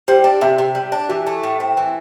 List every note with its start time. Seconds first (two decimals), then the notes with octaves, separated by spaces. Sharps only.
0.08 G3 C5
0.24 D4 D5
0.41 C3 E5
0.58 C3
0.75 G3
0.92 D4
1.09 E3 G4
1.27 A3
1.43 A2
1.60 C4
1.77 E3